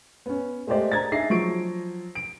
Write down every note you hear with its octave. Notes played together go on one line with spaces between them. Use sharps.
B3 C#4
G#3 A3 G4 C5 D5 D#5
A#5 G#6 A6
D4 D#4 G#4 E5 A#6 C7
F3 F#3 C#6 D7
D7